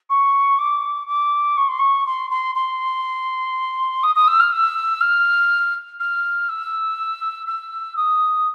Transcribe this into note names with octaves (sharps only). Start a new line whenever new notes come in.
C#6
D6
D6
C#6
C6
C#6
C6
C6
C6
D#6
D#6
E6
F6
E6
F6
F6
E6
E6
D#6